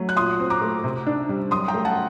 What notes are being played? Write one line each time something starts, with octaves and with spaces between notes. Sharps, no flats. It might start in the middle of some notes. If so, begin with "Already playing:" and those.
Already playing: F#3 A3
F#6
A#2 C6 D#6
C4
A#5 D6
A3
C3
D4
G3
F#2 C6 D#6
G5 A#5
A3
F#5 A5